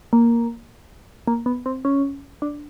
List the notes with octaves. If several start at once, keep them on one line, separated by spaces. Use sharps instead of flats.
A#3
A#3
B3
C4
C#4
D4